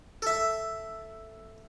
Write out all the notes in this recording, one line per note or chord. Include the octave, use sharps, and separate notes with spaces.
A4 E5